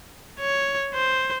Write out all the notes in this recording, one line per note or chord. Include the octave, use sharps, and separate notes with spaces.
C#5
C5